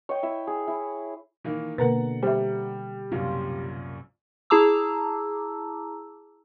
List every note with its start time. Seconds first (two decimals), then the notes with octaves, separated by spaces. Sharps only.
0.09 C#5 D#5 G5
0.23 E4 E5
0.47 G#4
0.68 E4
1.45 D#3 E3 A#3
1.78 B2 D3 A#3 A#4 B4 F#5 A#5 A6
2.23 G3 C5 E5
3.12 C2 F#2 A#2 F4
4.50 E4 G#4 A5 A#5 D6 E6